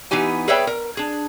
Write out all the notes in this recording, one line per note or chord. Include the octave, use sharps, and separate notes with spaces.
E3 B3 D#4 G4 G#5
G#4 B4 C#5 D5 E5 G5
A#4
D4 G#4